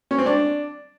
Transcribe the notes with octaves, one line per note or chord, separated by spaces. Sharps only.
C#4
C4
D4